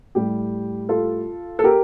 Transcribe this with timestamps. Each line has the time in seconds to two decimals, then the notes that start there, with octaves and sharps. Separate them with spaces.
0.15 A2 G3 G4
0.89 F4 A4
1.59 A4
1.64 G4 A#4